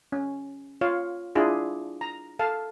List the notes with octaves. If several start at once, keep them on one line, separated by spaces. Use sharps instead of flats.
C#4
F4 C#5 F5
D4 E4 F4 G#4
A#5
A4 F5 A5